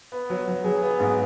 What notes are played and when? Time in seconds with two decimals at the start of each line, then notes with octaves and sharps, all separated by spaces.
0.12 B3
0.30 F#3
0.47 F#3
0.64 F#3 G#4
0.82 B3
1.00 G#2